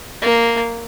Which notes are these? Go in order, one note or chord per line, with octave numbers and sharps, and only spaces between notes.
A#3